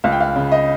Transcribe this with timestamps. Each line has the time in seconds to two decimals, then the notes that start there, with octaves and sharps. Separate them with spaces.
0.04 C#2 F5
0.12 G5
0.20 F5
0.36 C#3
0.52 D#5